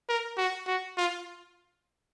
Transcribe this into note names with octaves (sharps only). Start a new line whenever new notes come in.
A#4
F#4
F#4
F4